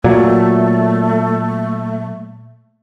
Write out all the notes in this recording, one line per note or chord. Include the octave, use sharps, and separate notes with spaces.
A#2 F#3 A3